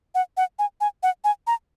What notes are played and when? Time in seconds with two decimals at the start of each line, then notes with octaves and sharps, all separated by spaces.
0.15 F#5
0.37 F#5
0.59 G#5
0.81 G#5
1.03 F#5
1.24 G#5
1.47 A#5